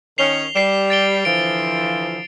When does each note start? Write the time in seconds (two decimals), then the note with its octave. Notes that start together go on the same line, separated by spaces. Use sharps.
0.18 D#3 C#4 C7 F7 G7
0.56 G3 C7 E7
0.90 A6 D7 G7
1.25 D3 E3 F3 D7